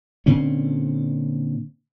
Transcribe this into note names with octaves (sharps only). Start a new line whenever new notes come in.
A#2 D3 C4 C#4